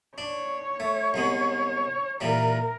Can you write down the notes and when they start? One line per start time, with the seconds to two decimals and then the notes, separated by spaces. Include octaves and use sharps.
0.18 D4 C#5
0.80 A3
1.14 C2 G#3 B3
2.20 A#2 E3 G3 A#4